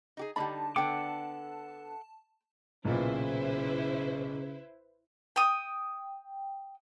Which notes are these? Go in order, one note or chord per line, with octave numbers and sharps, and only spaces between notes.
D#4 G4 G#4
D3 G3 D#4 G4 A5 B5
D3 B3 A4 F#5 G5 D6
B1 A#2 C#3 E4 B4 C5
G5 D#6